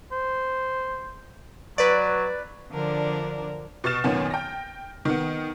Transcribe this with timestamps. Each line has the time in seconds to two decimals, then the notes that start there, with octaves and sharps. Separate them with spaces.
0.12 C5
1.78 F#3 B4 D5
2.71 D3 F3 D4 A#4 D5
3.84 B2 C#6 F6 A6 E7
4.04 F#2 A#2 D#3 B3 C#4
4.31 G5 F6 A#6
5.05 D#3 B3